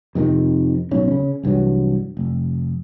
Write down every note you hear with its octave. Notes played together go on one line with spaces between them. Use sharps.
F2 C3 D#3
D1 B1 C#4
C#3 C#4
C2 G2 E3 F#3
F1